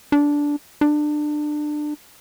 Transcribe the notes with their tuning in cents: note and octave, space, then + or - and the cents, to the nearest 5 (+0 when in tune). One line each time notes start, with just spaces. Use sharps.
D4 -10
D4 +25